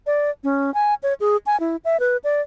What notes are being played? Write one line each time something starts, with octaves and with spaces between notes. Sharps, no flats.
D5
C#4
G#5
C#5
G#4
G#5
E4
E5
B4
D5